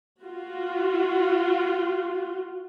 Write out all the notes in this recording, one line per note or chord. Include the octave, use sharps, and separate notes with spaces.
F4 F#4